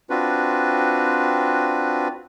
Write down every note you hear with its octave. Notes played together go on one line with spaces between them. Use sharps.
C4 D4 F4 F#4 B4